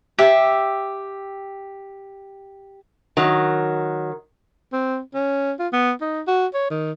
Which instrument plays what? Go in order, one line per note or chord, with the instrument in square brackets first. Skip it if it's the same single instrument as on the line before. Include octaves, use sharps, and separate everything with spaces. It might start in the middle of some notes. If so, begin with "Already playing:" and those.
[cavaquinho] G4 E5
[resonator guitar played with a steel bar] D#3 F#3
[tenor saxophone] C4
C#4
F4
B3
D#4
F#4
C#5
D#3